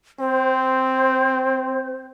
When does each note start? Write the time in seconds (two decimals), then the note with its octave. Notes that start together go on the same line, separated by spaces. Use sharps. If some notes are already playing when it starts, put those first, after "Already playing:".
0.20 C4 C5